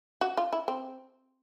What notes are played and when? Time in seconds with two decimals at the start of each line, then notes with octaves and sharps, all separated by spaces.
0.21 F#4
0.37 F4
0.53 E4
0.68 C4